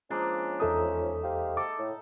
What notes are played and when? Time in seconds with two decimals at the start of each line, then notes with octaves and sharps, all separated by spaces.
0.10 F3 G#3 A#3 C#4 D4
0.60 E2 D#4 A4 D#5 E5 D#6
1.23 G4 C5 F5
1.57 A4 D6
1.78 A2